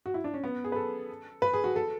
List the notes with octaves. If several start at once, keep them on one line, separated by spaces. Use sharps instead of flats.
F#4
E4
D4
C#4
B3
G#4
B4
A4
B4
G#4
F#4
A4